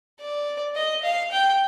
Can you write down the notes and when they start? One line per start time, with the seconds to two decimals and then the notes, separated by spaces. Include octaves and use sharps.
0.20 D5
0.76 D#5
1.03 F5
1.31 G5